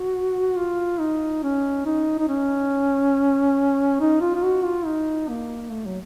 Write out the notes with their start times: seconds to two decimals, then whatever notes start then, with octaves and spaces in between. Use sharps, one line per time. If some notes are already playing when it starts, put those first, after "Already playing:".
Already playing: F#4
0.57 F4
1.00 D#4
1.43 C#4
1.86 D#4
2.19 D#4
2.29 C#4
4.01 D#4
4.21 F4
4.35 F4
4.43 F#4
4.65 F4
4.86 D#4
5.29 A#3
5.71 A3
5.86 F#3